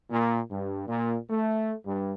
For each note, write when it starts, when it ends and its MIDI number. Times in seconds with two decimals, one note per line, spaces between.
0.10 0.38 46
0.51 0.83 43
0.88 1.15 46
1.30 1.73 57
1.86 2.14 43